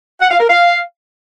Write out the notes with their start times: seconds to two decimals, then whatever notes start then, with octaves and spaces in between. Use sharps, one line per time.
0.20 F#5
0.30 F5
0.40 A#4
0.49 F5